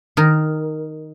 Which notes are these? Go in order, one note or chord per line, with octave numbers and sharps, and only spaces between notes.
D#3 A#4